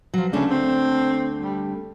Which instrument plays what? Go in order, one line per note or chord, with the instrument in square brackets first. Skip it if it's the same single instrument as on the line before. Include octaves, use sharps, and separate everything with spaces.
[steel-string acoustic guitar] F3 F#3
[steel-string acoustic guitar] D2 A3 D4 [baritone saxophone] C#3
[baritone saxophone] C4
G3